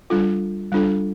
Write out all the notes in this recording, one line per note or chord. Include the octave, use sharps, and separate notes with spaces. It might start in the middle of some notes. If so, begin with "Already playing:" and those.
G3 D4 F4 A4
G3 D4 F4 A4